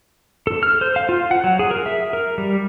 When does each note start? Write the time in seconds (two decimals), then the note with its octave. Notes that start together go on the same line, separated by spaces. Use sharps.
0.47 A4
0.63 F6
0.81 C5
0.96 F5
1.09 F4
1.31 F#5
1.44 F#3
1.59 G#4
1.71 A#4
1.86 E5
2.13 A#4
2.38 G3